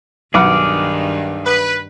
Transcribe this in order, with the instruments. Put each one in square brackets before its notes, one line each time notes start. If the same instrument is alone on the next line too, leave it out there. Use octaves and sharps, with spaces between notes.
[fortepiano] B1 F#5 [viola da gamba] G2 D#3 [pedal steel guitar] G#4 D6 F6
[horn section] B4